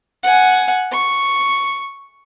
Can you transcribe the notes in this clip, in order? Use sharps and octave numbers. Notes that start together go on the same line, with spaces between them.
F#5 G#5
C#6